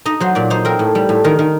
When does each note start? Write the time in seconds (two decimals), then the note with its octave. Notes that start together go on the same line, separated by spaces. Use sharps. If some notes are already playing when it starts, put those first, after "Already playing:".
0.05 D#4 D#5
0.20 F#3 C5
0.35 A#2 D5
0.50 D#4 C5
0.65 C4 A#4
0.79 A2
0.95 G3
1.09 A2
1.24 D#3 A#4
1.39 D#3